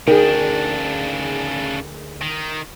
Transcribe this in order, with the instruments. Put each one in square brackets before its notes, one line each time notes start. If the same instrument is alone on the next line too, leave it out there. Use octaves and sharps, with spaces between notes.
[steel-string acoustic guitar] D2 A#4 G5 [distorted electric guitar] C#3 D4 [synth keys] D#4 G#4
[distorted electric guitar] D#3